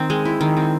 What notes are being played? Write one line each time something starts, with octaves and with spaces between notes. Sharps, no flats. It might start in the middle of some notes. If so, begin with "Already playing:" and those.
Already playing: D#3 C4
G#3
E4
D#3
C4